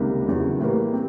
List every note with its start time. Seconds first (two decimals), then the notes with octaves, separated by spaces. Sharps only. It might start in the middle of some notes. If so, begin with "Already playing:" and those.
Already playing: C#2 C3 D#3 G3 A#3
0.26 E2 C#3 F#3
0.60 A2 E3 G3 A#3
0.93 C4